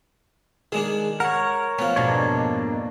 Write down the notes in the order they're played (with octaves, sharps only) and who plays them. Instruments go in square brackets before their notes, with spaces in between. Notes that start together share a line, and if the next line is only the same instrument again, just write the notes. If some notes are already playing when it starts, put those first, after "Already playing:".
[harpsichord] D#3 G#3 D4 [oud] G#4
[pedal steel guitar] A#4 C#5 [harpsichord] F#5
[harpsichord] F3 C#4 [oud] B3
[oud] F2 G#2 B2 [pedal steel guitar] A#3 D4 C#5